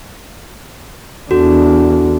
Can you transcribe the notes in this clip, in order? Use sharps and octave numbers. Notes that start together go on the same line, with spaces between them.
E2 D4 F#4 A4